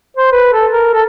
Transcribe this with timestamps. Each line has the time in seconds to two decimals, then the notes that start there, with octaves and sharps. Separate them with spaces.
0.17 C5
0.32 B4
0.53 A4
0.72 A#4
0.93 A4